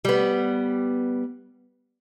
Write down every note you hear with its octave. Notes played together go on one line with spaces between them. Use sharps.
G3 B3